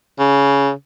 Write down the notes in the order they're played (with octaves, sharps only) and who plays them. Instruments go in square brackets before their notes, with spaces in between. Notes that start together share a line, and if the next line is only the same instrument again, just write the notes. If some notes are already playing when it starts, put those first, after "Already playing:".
[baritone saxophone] C#3